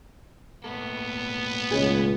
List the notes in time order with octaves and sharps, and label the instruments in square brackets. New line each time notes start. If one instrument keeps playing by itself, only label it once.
[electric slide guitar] A2 A#3 A4 [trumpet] B3
[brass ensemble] C#2 [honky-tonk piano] G#3 C#4 G#4